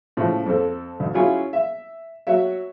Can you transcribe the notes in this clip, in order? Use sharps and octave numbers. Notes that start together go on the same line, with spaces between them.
A2 C#3 F3
F2 C4 A4
D2
F#3 C#4 E4 F4 G#4 C#5
E5
F#3 C#5 E5